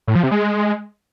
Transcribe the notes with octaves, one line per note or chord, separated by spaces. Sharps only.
A2
F3
C3
G#3